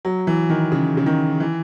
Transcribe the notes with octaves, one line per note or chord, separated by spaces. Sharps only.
F#3
E3
D#3
C#3
C#3
D#3
E3